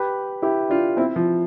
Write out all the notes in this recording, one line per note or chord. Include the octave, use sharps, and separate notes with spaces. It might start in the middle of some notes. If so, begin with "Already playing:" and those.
Already playing: G4 B4
E4 G4
D4 F4
C4 E4
F3